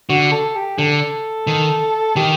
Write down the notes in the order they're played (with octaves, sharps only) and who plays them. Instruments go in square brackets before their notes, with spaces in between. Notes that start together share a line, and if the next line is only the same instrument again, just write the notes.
[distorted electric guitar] D3 [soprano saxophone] F#4
[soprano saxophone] A4
G4
[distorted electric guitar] D3 [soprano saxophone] A4
[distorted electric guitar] D#3
[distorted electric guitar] D#3 [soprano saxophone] G4